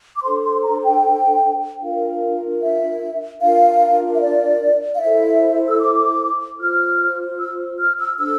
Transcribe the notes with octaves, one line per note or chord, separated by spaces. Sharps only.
D6
D4 A4 C5 C6
C6
A#5
G5
D4 F4 A#4 F5
E5
D4 F4 A#4 F5
E5
D5
F5
E4 A4 C5 E5
E6
D6
F4 C5 F6
E6
F6
E6
D4 A4 C5 E6